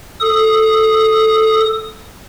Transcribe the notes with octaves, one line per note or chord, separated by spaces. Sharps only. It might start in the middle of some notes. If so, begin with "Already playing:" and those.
A4 D#6